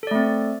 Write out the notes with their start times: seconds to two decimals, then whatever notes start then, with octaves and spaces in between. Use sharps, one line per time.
0.03 A4
0.07 D5
0.11 A3
0.15 C4